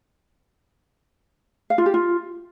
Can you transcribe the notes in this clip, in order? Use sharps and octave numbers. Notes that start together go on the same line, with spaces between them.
F5
F4
G4
F4